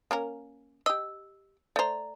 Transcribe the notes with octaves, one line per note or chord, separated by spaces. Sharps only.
A#3 C#4 A#4
G4 D#5 E6
A3 C5 D5 A#5